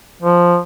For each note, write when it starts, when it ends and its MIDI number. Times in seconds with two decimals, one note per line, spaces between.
0.22 0.58 53